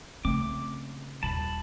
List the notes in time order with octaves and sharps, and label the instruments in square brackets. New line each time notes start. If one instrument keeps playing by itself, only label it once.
[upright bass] C#3 [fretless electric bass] A3 C4 [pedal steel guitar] D6
[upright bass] D#1 [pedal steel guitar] A5 B5